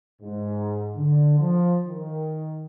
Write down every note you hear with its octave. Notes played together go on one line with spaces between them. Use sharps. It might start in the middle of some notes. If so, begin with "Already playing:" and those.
G#2
D3
F3
D#3